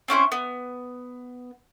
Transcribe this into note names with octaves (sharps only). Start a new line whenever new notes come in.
C4 C#4 E4 C5
B3